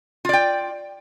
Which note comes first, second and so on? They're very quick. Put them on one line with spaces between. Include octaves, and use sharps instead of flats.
F4 D5 G5